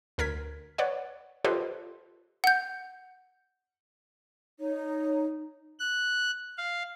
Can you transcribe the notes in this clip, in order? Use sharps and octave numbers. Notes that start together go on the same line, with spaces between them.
D2 A#4 G#6 B6
B4 C#5 D5 F#5
F4 G4 A4 B4 C5 D#5
F#5 G6
D#4 C#5
F#6
F5